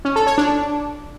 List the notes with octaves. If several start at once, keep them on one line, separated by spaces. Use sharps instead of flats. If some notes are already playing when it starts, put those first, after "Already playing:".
C#4
A4
C#5
D4